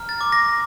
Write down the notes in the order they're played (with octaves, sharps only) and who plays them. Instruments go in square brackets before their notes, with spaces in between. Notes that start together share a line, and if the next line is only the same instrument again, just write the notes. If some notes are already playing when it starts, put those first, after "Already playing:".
Already playing: [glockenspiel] A#5 F6
A6
D6
A#6